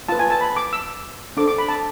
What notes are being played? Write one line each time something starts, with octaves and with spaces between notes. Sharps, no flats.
F4 B4 A5
G#5
A5
B5
D6
E6
D4 A4 C5 D6
D6
B5
A5